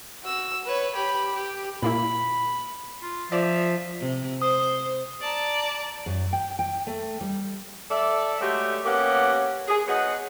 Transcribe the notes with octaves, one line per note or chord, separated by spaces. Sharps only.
F#4 E6
B4 C#5
G4 B5
G4
A#2 A#3 E4 B5
F4
F3 D5 E5
C3
C5 D#6
D5 A5 A#5
F#2
G5
G5
A3
G3
A4 D5 E5
F#3 G#3 A3 G4
A#3 B3 C#4 G4 F#5
G#4
F#3 B3 D#4 G#4 F#5